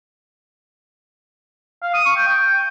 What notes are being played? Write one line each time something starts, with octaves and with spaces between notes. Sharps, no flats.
F5
D#6
C#6
G5
G5